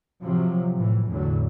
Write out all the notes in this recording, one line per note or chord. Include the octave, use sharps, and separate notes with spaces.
C3 F3 F#3
A2 E3
A1 E2 D3 F#3